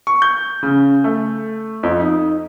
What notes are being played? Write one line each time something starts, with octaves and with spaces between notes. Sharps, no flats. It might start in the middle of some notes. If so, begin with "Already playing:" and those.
C#6
G6
C#3
A3
F2
D#4